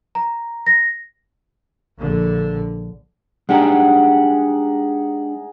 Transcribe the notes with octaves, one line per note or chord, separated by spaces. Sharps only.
A#5
A#6
A#1 D3
G#3 D4 D#4 G4 G#4 F#5